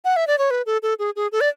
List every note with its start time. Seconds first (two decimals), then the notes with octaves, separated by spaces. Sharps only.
0.05 F#5
0.16 E5
0.27 D5
0.38 C#5
0.51 B4
0.66 A4
0.83 A4
0.99 G#4
1.16 G#4
1.32 A4
1.41 D5